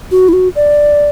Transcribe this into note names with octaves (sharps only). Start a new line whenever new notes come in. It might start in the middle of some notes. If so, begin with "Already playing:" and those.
F#4
E4
F#4
D5